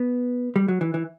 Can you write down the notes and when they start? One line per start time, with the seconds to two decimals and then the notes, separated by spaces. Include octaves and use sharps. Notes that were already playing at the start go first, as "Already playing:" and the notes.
Already playing: B3
0.56 G3
0.68 F#3
0.81 E3
0.94 E3